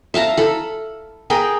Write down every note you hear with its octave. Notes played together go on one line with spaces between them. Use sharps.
E5 F5 A5 A#5
A4 B5
G#4 A#4 G5 B5